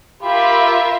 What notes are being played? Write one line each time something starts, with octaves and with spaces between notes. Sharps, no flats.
F4 G4 A#4 E5 B5